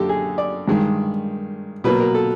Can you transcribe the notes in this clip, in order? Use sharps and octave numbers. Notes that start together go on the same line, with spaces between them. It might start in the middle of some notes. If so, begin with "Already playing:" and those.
Already playing: F#2 D3 A#3 G4 A4
G#4
D5
G2 D#3 G#3
B2 F#3 A#3 B4
A#4
A4